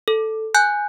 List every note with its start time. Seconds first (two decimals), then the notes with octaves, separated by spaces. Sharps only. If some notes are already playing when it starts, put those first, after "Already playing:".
0.08 A4
0.55 G#5 F#6 G6